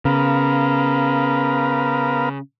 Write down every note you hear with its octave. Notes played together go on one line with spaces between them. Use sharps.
C#3 B3 A#4 F5